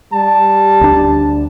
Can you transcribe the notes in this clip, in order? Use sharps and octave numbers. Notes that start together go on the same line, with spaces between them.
G3 A5
D2 D4